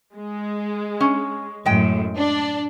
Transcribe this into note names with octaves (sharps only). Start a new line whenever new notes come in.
G#3
C#4
F#2 A2 G#3 G5
D4